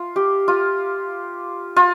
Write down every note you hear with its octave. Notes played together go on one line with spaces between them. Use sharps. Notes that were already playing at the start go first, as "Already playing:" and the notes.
Already playing: F4
G4
F4
F4